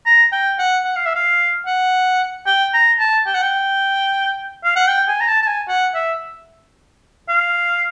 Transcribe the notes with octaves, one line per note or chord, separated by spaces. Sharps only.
A#5
G5
F#5
F#5
F5
E5
F5
F#5
G5
A#5
A5
G5
F#5
G5
F5
F#5
G5
G#5
A#5
A5
A5
G#5
F#5
E5
F5